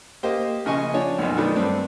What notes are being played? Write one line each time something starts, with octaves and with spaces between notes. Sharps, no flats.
A#3 G4 C5 D#5
A#1 C#3 D#5 G#5 C#6
F3 D4 C#5
B1 F#2 B2
D#3 F#3 A3 B3 D4
G2 C4 D4